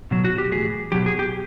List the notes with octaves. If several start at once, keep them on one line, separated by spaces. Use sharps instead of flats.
B2 F#3
F#4
G4
A2 E3 G#4
B2 F#3 G4
G#4
G4